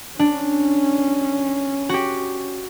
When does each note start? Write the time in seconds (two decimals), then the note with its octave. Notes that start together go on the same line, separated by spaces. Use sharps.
0.19 C#4 D4
1.89 F#4 G4